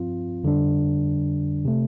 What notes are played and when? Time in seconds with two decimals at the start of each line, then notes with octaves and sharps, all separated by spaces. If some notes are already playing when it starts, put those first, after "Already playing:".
Already playing: G2 F3 C4 F4
0.43 F2 D3 G3 D4
1.65 C3 A3